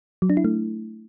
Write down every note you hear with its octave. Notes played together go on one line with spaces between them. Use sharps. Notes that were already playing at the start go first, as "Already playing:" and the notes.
F#3
D4
E4
A3